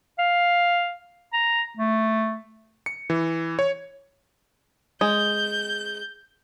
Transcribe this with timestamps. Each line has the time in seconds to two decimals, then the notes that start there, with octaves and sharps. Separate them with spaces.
0.19 F5
1.33 A#5
1.77 A3
2.86 C#7
3.10 E3
3.59 C#5
5.01 G#3 G6